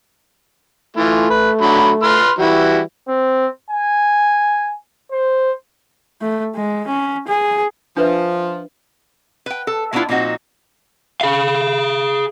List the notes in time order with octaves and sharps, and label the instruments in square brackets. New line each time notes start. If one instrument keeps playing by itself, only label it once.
[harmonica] E3 F4 [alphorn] A3
[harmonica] B4
D3 F#3 B5
B4 C6 F6
[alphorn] E3 [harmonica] G3 E4 F#4
[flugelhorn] C4
G#5
C5
[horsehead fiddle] A3
G#3
C#4
G#4
[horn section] F3 [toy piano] D4 B4 E5
[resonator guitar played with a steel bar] B4 G5
A4
G#3 A3 B3 D4 E4 F4
A#2 F3 C4 D#4 F#4
[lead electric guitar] G#4 F5